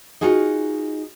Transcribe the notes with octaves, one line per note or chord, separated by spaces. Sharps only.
D#4 F4 F#4 G#4 D#5